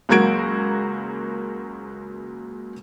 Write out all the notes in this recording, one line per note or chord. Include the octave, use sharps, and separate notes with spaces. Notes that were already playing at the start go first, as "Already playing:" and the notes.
C#2 F#3 A#3 F#4 G#6 D7